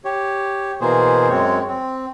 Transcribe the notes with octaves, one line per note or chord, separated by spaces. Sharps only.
G4 C#5
B2 E3 A#3 G#4 C5
F#2 G#3 C4 C#5
C4